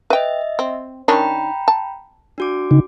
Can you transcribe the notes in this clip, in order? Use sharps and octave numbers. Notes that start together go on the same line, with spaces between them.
B4 D#5 E5 G5
C4
D#3 C#4 D4 G5 A#5 B5
A5
D4 F#4 D6
C#3 D#4